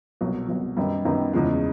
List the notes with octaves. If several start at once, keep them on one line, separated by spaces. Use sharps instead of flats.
C2 B2 F#3
C2 B2 F#3
F#2 D#3 G3 B3 D#4
F#2 D#3 G3 B3 D#4
E2 C#3 F3 G#3